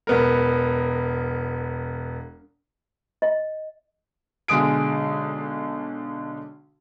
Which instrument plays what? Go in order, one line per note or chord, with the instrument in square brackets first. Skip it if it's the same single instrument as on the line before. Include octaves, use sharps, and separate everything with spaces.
[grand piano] E1 B3 A#4
[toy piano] D#5
[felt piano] B1 D3 G#3 D#6 D7